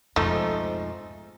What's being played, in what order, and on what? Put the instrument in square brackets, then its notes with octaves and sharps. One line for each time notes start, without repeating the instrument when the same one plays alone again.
[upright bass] F2 B2 [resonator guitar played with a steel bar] G#2 F3 D#4 [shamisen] A3